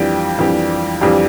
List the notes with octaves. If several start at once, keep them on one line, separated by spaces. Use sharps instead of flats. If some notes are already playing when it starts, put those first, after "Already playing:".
Already playing: F2 E3 G3 D4 G4
F2 E3 G3 D4 G4
F2 E3 G3 D4 G4